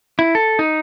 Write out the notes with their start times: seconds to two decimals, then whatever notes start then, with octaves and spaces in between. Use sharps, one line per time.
0.19 E4
0.35 A4
0.59 D#4